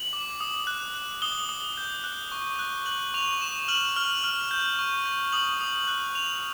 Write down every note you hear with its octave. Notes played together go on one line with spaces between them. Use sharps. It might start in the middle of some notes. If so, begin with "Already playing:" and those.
Already playing: F#7
D6
D#6
F#6
F#6
D#6 G7
D#6
G6
F#6
C#6
F#6
F#6 F#7
C#6 F7
C#6 E7
F6 F#7
F6
F6
G6
C#6
G6
D#6 F#7
D#6
F#6
F#6 F7